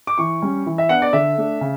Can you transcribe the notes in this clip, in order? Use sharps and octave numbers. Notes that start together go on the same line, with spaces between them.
D6
E3 C#6
G3 C#4
E3
E5
B3 D4 F#5
D5
D3 E5
A3 D4
C#3